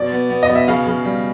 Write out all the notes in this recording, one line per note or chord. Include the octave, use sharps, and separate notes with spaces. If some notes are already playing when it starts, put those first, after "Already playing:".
Already playing: B2 D5
B3
B3
D#5
B2
E5
C#3 F5
C#3
G3